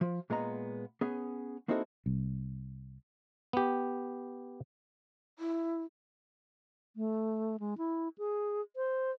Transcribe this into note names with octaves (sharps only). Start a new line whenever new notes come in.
F3
A#2 G#3 B3 F#5 A#5
B3 C#4 G#4
A#3 C4 D#4 E4 F#4 A4
C2
B3 G4
E4
A3
G#3
E4
G#4
C5